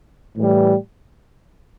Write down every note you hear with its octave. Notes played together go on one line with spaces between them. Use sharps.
A2 E3 G3